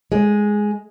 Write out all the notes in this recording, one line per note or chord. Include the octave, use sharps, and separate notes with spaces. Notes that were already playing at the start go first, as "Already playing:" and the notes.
G#3